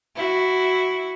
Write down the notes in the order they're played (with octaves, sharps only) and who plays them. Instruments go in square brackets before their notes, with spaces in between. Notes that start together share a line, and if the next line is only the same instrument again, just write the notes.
[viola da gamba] E4 F#4